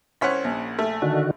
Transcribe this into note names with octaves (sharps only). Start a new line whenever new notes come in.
C2 C#4 C5 C#5 F#5 B6
A#1
A3
D3 D#3 F#4